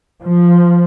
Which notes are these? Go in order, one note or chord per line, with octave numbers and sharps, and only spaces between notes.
F3